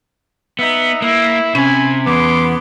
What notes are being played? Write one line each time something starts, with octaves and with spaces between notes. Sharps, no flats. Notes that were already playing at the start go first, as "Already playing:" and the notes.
B3 D#4 E5
A#3 E4
C3 C#4 G#5 B5
E2 B3 C6 D6